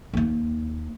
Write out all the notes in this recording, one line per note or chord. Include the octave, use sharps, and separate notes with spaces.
D#2 A#3